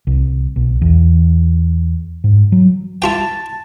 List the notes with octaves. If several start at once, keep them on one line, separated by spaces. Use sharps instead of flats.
C2
B1
E2
G#2
F#3
E4 F4 G5 A5